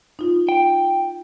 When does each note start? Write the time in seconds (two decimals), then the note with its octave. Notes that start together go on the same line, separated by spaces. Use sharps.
0.19 D#4 F4
0.49 G5